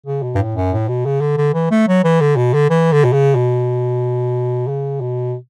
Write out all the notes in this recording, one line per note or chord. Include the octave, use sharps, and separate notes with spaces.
C#3
B2
G2
A2
F#2
A2
B2
C#3
D3
D3
E3
A3
F#3
E3
D3
B2
D3
E3
D3
B2
C#3
B2
C#3
B2